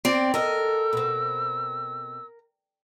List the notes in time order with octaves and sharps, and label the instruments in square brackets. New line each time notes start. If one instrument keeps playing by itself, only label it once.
[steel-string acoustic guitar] C4 D5
[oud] A4 D#5 [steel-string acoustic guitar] A#4 [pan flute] E6
[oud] B2 C4